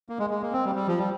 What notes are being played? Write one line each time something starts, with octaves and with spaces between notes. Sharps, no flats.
A#3
G#3
G#3
A#3
C4
G3
G3
F3
G3